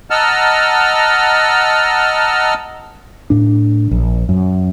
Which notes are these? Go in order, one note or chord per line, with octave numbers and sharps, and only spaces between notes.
D#5 F#5 A5 A#5 E6 F6
A2 D4
A#1
F#2